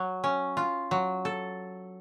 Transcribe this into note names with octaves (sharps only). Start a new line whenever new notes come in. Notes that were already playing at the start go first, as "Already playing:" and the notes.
Already playing: F#3
C#4
F4
F#3
A4